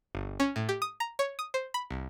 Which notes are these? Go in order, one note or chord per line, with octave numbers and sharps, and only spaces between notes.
G1
C#4
A2
G4
D#6
A#5
C#5
D#6
C5
B5
C2